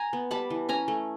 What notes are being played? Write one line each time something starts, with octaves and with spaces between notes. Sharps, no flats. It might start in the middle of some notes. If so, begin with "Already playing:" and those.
Already playing: G#5 A#5
B3
G3 A5 B5
E3
C#4 G#5 A#5
A3